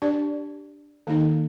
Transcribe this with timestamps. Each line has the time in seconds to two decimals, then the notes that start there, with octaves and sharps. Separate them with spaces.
0.02 D4 G4 D5
1.07 D#3 A#3 D#4